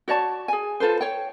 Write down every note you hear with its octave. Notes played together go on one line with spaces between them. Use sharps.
F#4 C#5 D5 A5
G#4 G#5
F4 A4 B4 C5
C#5 G5